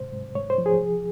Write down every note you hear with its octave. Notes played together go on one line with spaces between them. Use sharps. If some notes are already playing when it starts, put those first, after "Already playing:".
Already playing: G#2 C3 C5
G#2
G#2 C#5
C5
F3
G#4
C2